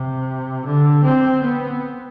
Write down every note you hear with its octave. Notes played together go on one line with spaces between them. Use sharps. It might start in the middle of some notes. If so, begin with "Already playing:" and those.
Already playing: C3
D3
C4
B3